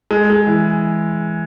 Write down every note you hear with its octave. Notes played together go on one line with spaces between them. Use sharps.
G#3
G#3
E3